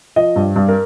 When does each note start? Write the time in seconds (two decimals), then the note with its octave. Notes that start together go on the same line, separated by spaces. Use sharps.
0.16 F3 D#5
0.36 G2
0.56 G2
0.68 A#4